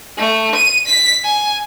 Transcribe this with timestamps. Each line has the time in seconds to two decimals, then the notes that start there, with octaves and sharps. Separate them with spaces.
0.18 A3
0.55 D#7
0.86 B6
1.24 G#5